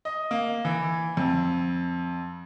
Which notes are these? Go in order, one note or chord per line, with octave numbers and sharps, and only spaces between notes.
D#5
A#3
E3
F2